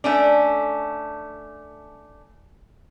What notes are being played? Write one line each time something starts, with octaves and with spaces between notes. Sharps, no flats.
A3 C#4 D4